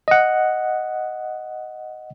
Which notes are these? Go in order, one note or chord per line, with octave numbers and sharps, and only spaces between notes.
D#5 F#5